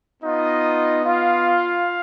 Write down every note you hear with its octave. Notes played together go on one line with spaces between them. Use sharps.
B3 D#4 F4 D#5
F4 F5